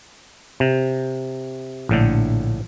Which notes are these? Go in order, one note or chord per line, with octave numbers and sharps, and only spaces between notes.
C3
A#1 A2 D3